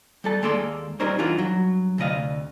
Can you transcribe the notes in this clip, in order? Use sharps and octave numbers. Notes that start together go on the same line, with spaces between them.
G3 A4 A5
D#2 G#3 A#3 A4 D5 C6
G3 C4 D#4 A#4 C5 C#5
E3 D4 D#4 F4 F#4 A#4
G2 F#3
D2 C3 D#5 F5